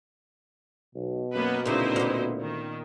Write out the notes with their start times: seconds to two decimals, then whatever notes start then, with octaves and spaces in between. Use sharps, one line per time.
0.95 B1 B2
1.34 F#2 A#3 B3 B4
1.65 D2 A#2 C#3 D#4 E4 C5
1.96 A#2 B3
2.40 D#3